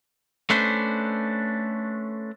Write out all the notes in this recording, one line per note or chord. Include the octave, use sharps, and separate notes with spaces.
A3 C#4 D4 B4 C5